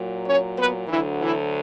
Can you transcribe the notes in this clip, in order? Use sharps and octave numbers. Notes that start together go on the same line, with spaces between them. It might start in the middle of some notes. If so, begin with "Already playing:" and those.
Already playing: A#2 F#3
C#4 C#5
B3 B4
D2 D3 E3 F#3 E4
E3 E4